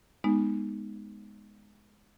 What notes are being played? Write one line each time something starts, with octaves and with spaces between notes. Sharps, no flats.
G#3 B3 D#4